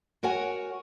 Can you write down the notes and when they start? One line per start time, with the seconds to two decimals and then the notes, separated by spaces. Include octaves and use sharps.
0.23 F#4 A#4 C#5 F#5 G#5